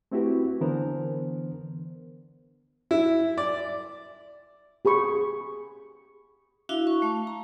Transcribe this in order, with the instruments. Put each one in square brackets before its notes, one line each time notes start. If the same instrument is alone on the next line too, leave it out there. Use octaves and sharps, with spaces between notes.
[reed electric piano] A3 C4 E4 F#4 G4 B4
D3 E3 B3 D4 A#4 C5
[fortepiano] E4
D5
[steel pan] G4 G#4 B5 C#6
[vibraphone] D4 E4 F#4 E5 F5
C#6
A3 F5
A#5